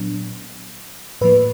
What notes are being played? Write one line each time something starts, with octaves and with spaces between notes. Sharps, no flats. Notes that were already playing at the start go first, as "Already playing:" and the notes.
Already playing: A#2 F#3 B3 D4
A2 F3 A#3 B4